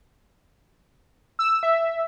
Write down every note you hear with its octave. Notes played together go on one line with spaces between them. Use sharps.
E6
E5